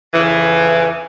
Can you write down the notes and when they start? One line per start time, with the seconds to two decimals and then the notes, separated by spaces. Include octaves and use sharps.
0.14 F2 C#3 E3